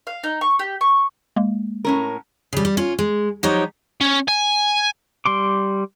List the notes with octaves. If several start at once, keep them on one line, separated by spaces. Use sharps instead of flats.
F5
D#4
C#6
G4
C#6
G#3 A#3
A2 C#4 A#4
C#3 G3
G3
C#4 F4
G#3
F3 F#3 D#4 G4 C#5
C#4
G#5
G3 C6 D6